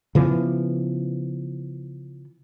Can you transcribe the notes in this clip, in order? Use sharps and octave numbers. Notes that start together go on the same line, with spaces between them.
C#3 E3 F3 B3